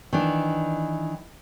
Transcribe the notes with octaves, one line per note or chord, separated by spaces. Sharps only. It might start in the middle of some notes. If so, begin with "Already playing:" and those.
D#3 E3 D4